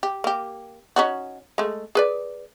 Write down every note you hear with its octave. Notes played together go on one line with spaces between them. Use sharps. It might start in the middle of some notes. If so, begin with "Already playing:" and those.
G4
A#3 G4
C#4 D#4 F#4
G#3 A3
G#4 B4 D5